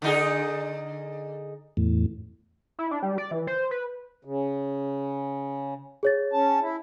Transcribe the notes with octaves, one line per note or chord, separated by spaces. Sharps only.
D3 D#4 G#4
E2 A2
E4
D4
G3
D5
E3
C5
B4
C#3
G#4 C#5 A6
C#4 A5
E4